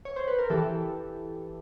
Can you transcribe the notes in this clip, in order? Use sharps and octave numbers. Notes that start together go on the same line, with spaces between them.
C#5
C5
B4
A#4
E3 G4 A4